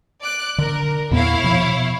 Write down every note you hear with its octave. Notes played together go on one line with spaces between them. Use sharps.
D5 F#6 D7
D3 A#4
E2 A#2 B3 E4 C#5 F5
B2 F3